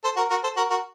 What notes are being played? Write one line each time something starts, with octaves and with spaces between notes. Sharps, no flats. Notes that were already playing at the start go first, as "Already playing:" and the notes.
A4 C5
F#4 A#4
F#4 A#4
A4 C5
F#4 A#4
F#4 A#4